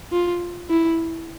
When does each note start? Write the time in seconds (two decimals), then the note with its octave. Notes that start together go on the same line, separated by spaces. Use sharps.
0.12 F4
0.70 E4